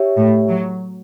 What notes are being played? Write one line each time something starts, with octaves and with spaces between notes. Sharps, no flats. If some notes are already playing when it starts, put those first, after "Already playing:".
Already playing: G4 C#5 E5
A2
F#3